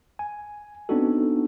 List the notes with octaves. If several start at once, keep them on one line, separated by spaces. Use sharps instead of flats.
G#5
B3 C4 D4 D#4 F#4 A4